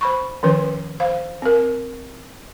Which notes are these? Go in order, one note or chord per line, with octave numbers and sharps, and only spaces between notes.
C5 B5 C#6
D#3 F3 C#4 B4
C5 F5
C4 A#4